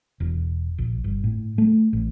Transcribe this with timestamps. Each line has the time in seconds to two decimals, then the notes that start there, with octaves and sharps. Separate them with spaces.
0.20 E1
0.78 A#1
1.04 G1
1.24 A2
1.58 A3
1.93 A1